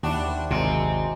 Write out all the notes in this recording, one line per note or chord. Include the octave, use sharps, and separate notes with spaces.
D#2 G3 D4 E4 F#4
C5
G#1 C3 F#3 G#3 C4